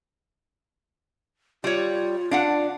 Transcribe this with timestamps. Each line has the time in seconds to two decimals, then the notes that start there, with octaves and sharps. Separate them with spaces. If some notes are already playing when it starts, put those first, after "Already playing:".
1.64 G3 F4 C#5
2.31 D4 F5 F#5